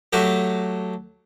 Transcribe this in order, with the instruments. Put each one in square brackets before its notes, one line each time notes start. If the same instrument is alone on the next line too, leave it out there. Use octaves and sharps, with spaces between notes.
[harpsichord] F#3 A3 F#4 G4